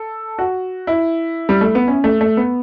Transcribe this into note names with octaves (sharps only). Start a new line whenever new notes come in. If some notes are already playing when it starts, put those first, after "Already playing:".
Already playing: A4
F#4
E4
G3
A3
B3
C#4
A3
A3
B3